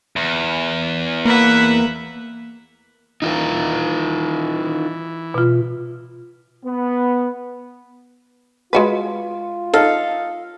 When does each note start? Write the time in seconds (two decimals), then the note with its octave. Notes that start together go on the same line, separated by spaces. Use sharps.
0.16 E2
1.25 A#3 B4 E5 F#5
3.22 E3 D#4 F4 A#4
5.34 B2 F4
6.64 B3
8.73 G#3 F4 F#4 B4
9.74 D#4 A4 F5